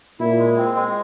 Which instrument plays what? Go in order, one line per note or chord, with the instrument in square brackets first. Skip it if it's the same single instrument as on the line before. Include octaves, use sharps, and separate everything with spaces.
[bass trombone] A#2 [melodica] E4
[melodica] G#3
C4
G#3